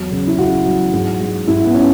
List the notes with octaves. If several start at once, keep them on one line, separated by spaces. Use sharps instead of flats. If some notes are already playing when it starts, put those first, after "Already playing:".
Already playing: E2 F#3
C#3
E4
C#2 F#4
F#3
G#2
G#3
G#2 E4
B3
C#4